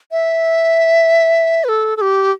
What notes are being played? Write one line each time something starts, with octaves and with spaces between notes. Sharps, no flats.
E5
B4
A4
A4
G4